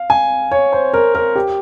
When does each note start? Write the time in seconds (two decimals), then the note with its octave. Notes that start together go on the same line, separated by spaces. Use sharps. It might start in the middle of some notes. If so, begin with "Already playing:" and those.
Already playing: F5
0.10 G#5
0.52 C#5
0.73 C5
0.94 A#4
1.15 A#4
1.36 G4